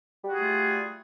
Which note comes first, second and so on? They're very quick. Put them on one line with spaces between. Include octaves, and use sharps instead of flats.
G3 F#4 G#4 A3 F4